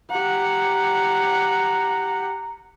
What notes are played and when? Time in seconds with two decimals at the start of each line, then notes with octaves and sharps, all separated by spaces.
0.11 G4 F#5 A#5